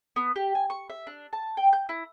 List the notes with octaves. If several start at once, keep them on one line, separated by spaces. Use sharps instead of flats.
B3
G4
G#5
C#6
E5
D4
A5
G5
G6
E4